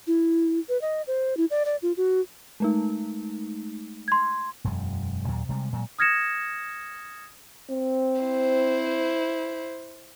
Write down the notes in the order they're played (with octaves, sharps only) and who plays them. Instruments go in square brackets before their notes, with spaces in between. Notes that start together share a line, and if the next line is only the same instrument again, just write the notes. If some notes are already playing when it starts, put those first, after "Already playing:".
[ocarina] E4
B4
D#5
C5
E4
D5
D5
F4
F#4
[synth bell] G#3 A3 D#4
[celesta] C6 G#6
[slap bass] E1 F#2 G#3
D#2 A#2 F#3
C3 G3 G#3
A#2 F#3 G#3
[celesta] D#6 F6 G#6 A#6 C#7 E7
[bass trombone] C4
[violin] E4 C5